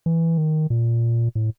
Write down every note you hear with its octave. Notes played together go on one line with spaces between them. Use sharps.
E3
D#3
A#2
A2